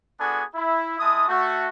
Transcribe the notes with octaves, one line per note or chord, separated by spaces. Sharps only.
B3 D4 F#4 G#4 A4 G#5
E4
G#3 E4 A5 D#6
A3 F#4